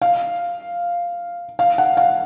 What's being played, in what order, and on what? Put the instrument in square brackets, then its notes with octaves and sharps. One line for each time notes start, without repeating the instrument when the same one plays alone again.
[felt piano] F5
F5
F#5
F5